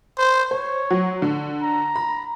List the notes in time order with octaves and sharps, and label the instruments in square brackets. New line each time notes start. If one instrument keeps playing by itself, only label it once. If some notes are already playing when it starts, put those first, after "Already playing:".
[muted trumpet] C5
[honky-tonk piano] C5 [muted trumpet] C#5
[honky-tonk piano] F#3
D3
[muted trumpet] A#5
[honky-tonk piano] B5